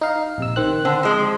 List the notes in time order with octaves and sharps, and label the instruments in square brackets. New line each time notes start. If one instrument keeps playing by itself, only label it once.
[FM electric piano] D#4 F5
A#1 C3 E6
D#3 C4 F#6
[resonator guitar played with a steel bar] D3 [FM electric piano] C4
[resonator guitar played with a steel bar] F3 G#3